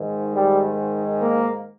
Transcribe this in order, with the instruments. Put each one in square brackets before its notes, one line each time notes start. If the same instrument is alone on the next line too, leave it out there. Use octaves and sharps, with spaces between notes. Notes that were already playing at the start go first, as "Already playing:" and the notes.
Already playing: [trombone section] G#2 D#3
G3
A#3